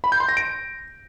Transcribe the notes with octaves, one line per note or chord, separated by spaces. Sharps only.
B5
G6
C6
A#6
D7